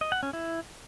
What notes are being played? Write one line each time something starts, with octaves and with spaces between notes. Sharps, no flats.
D#5
F#5
C#4
E4